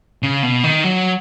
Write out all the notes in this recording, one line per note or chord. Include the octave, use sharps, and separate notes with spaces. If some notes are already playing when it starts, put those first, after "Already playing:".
C#3
B2
D#3
F#3